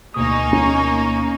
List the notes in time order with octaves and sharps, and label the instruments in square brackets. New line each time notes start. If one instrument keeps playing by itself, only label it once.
[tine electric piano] D2 B2 D#6 [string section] A#3 D#4 [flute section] G#5 C#6
[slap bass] C#4